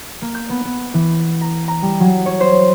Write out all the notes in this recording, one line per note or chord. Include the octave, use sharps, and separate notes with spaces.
A#3
G6
B3
B3
E3
A#5
A#5
G3
F#3
C#5
C5